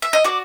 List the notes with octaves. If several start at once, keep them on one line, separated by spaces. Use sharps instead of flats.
E5
D#5
F#4 D5